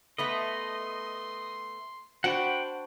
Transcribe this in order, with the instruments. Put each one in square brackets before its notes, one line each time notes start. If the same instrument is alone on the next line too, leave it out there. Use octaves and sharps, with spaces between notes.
[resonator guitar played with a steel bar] A3 B3 B4 [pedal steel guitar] D#5 [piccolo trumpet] C6
[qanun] D4 F#4 C5 [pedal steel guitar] F#5 G5 B5